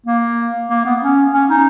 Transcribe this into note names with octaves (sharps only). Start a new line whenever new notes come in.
A#3
A#3
B3
C#4
C#4
D#4